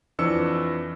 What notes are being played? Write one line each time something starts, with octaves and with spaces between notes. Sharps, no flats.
F2 E3 D4 E6 C#7